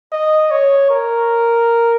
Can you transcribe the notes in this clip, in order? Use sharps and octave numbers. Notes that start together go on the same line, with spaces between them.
D#5
C#5
A#4